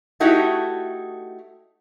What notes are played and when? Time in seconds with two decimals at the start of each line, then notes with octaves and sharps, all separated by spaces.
0.20 A3 D#4 E4 F#4 G4